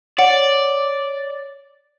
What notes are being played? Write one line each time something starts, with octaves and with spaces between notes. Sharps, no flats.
C#5 D5 F#5